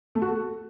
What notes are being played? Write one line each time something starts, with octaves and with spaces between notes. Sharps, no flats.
A3
F#4
A4